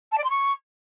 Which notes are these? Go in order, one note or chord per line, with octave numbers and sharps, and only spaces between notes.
A5
D5
C6
C#6